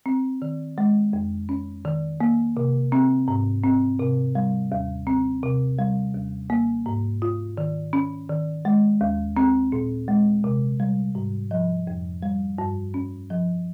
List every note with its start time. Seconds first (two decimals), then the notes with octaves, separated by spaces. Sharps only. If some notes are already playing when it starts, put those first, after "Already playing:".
0.06 C4
0.42 D#3
0.78 G#3
1.13 F2
1.49 C#4
1.85 D#3
2.20 A#3
2.57 C3
2.92 C4
3.28 G#2
3.64 C4
3.99 C3
4.35 G3
4.72 D#2
5.07 C4
5.43 C3
5.79 G3
6.15 D#2
6.50 A#3
6.86 G#2
7.22 F4
7.57 D#3
7.93 C#4
8.29 D#3
8.65 G#3
9.01 D#2
9.37 C4
9.72 A#2
10.08 G#3
10.44 C3
10.80 G3
11.15 G#2
11.51 F3
11.87 F2
12.22 G3
12.58 G2
12.94 C#4
13.30 F3